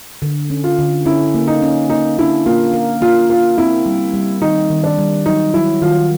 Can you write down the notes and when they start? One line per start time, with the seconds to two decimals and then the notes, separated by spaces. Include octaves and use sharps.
0.22 D3
0.50 C#4
0.64 F4
0.79 D3
1.05 C#4 E4
1.34 A#3
1.47 D#4
1.62 C#4
1.90 A#3 D#4
2.19 D4 E4
2.46 A#3 F4
2.74 A#4
3.02 A#3 F4
3.30 F4 A#4
3.58 C4 E4
3.86 G3
4.14 G3
4.42 D#3 D#4
4.70 D#3
4.84 D4
4.98 G3
5.26 F#3 D#4
5.54 F#3 E4
5.82 D#3 F4